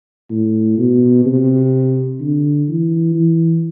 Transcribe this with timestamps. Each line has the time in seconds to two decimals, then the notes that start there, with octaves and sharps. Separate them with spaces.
0.30 A2
0.78 B2
1.25 C3
2.20 D3
2.69 E3
3.15 E3